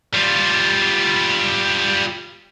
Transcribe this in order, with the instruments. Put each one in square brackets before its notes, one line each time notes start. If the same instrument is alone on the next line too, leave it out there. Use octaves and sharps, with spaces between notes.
[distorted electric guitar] G3 F4